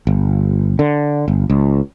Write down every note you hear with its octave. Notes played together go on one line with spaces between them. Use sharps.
G1
D3
G1
C#2